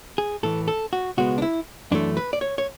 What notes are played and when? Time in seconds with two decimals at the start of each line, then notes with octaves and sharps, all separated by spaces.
0.18 G#4
0.43 A2 E3 A3 A4
0.68 A4
0.93 F#4
1.17 C#2 B2 G#3 B3 F#4
1.38 D4
1.42 E4
1.91 F#2 E3 A3 D4
2.17 B4
2.33 D5
2.41 C#5
2.58 C#5